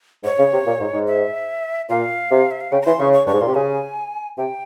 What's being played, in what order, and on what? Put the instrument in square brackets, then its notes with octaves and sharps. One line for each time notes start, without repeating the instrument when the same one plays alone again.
[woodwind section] G#2 [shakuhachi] C#5
[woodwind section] C#3
C3
A#2
G#2
G#2
[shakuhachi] E5
[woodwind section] A#2 [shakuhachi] F5
[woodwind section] C3
[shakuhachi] E5
F5
[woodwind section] C#3 [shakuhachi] G5
[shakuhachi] A#5
[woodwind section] E3 [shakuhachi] C6
[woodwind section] C#3 [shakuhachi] C#6
[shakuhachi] C#6
[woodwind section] G2 [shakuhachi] C#6
[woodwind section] G#2
[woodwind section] A#2 [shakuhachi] C6
[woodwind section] C3
[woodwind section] C#3 [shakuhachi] G#5
[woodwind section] C3 [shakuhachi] G5